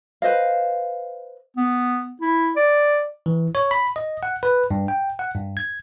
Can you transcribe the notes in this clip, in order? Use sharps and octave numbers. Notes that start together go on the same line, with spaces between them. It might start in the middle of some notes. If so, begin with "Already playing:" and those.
B4 C5 D#5 F5
B3
E4
D5
E3
C#5
B5
D#5
F#5
B4
G2
G5
F#5
G2
G#6